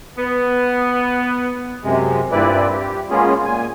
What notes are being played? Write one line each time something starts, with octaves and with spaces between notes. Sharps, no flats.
B3
F#2 C3 G#3
G2 A#2 C4 E4 B4 D5
G4
G#3 A#3 B3 C#4 F4 G#4
A#2 G#5